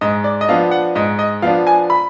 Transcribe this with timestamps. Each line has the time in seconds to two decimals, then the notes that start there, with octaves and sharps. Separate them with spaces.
0.01 G#2 D#5
0.24 D5
0.41 D#5
0.48 F3 B3 D4 F5
0.71 F#5
0.95 G#2 D#5
1.19 D#5
1.42 F3 B3 D4 F5
1.67 G#5
1.90 B5